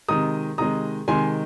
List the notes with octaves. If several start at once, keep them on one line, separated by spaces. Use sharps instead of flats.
C3 D#3 G#3 A#5 D#6
C3 D#3 G#3 A#5 D#6
C3 D#3 G#3 G#5 C6